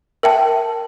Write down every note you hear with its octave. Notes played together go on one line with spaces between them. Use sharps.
A#4 E5 G5 A5